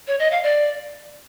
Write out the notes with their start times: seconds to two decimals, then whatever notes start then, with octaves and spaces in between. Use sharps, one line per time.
0.08 C#5
0.19 D#5
0.31 F5
0.43 D5